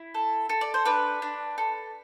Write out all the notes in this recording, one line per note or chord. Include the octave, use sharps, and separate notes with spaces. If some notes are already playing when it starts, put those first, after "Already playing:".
Already playing: E4
A4
A4
D5
C5
D4 B4
D4
A4